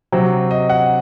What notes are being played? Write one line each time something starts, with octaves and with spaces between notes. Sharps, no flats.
C3 F#3 C4
D#5
F#5